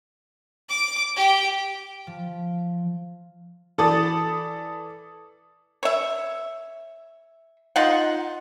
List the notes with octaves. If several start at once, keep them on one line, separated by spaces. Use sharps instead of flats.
D6
G4
F3
E3 A4 D5 A5 D#6 A6
C#5 E5
D#4 F4 F#5